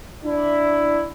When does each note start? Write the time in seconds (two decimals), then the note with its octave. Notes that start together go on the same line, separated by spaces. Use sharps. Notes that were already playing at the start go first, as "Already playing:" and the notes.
0.23 D4 E4